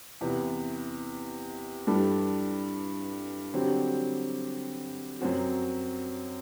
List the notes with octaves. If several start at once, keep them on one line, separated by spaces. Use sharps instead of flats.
E2 C3 E3 B3
G2 E3 G3 D4 A4
D3 F#3 C4 G4
F#2 F#3 C4 F#4